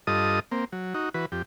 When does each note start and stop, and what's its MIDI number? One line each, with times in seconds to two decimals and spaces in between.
0.07 0.40 43
0.07 0.40 65
0.07 0.40 69
0.07 0.40 75
0.07 0.40 87
0.52 0.65 58
0.52 0.65 60
0.72 0.94 54
0.94 1.09 63
0.94 1.09 66
1.14 1.26 52
1.14 1.26 66
1.14 1.26 71
1.32 1.42 41
1.32 1.42 67